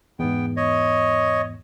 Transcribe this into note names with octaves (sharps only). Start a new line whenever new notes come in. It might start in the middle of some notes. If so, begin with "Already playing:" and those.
E2 G#2 B3 G5
C#5 D#5